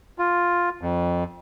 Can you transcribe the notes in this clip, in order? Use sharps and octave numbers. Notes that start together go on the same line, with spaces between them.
F4
F2